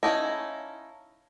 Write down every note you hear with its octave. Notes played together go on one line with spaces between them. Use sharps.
C#4 D#4 E4 F5 A5 A#6